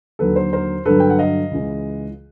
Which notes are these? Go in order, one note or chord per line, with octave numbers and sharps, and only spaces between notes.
D#2 D3 F#3 A4 B4
A#4 C5
A#4 C5
G2 D3 F#3 A4 B4
G5
F#5
D#5 F5
C#2 C#3 E3 G#3